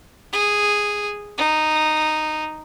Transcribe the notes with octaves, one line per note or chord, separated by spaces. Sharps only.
G#4
D#4